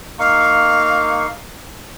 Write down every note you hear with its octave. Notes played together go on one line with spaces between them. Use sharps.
A#3 D#4 F5 C#6